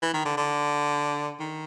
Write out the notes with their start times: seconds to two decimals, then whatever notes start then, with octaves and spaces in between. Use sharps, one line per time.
0.02 E3
0.14 D#3
0.25 D3
0.38 D3
1.40 D#3